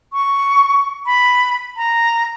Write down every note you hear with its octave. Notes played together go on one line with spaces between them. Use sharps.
C#6
B5
A#5